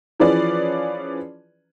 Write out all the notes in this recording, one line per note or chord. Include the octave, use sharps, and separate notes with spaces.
E3 F3 C#4 G#4 B4 D5